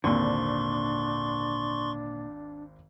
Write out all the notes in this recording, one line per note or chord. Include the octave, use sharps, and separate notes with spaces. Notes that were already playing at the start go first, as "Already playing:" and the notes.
G#1 D#2 A#2 D3 C4 D4 C6 C#6